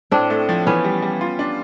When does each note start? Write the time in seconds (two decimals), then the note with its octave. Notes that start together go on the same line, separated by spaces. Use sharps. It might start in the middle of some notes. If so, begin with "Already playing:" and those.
0.11 A2 C4 D4
0.30 A3
0.49 F3
0.66 E3 B3 C#4
0.84 G3
1.02 G3
1.21 F4
1.39 D4